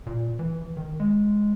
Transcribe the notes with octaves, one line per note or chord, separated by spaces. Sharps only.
A#2
E3
D#3
G#3